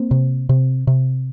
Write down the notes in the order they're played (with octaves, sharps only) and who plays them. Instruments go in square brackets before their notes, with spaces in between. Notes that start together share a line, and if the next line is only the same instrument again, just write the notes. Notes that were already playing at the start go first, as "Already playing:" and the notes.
Already playing: [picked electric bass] A#3 C4
C3
C3
C3